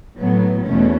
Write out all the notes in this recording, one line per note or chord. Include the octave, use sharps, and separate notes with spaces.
A2 F#3 B3
E2 B2 A3 C#4